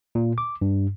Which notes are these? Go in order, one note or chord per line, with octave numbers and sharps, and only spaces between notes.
A#2
D6
G2